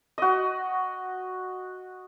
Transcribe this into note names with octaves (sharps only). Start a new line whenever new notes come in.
F#4 D#5